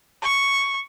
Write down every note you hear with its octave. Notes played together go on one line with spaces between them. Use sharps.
C#6